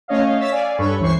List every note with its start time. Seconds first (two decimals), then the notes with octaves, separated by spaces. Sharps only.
0.08 A3 C#4 C#5 D#5 F5
0.39 C#5 E6 A6 B6
0.52 D5 F5 G#5
0.78 G2 A4 B4 C#5 B5 C#6
0.99 C#2 E3 C5 C#6 C7